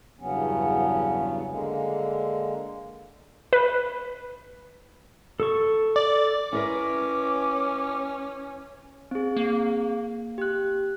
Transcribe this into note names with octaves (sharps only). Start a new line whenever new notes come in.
E2 G2 C#3 F#3 B3 C#4
D3 G#3 A#3
B4
A4 C#6
D5
C#4 E4 A#4 B4 D6
C4 G#4
A#3
G4 F#6